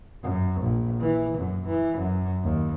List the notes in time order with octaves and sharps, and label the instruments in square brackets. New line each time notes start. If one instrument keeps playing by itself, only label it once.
[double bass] F#2
A#1
E3
F#2
E3
F#2
D#2